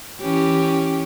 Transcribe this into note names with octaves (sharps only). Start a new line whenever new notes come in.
E3 C#4 G4